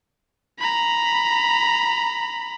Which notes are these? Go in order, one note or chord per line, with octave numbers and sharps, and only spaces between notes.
A#5 B5